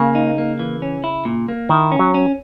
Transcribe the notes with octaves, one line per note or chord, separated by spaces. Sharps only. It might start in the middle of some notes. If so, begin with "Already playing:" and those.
Already playing: C#3 A#3
D#4
A#3
E3
C#4
E4
A#2
A#3
D#3 E4
C#4
F#3
C#4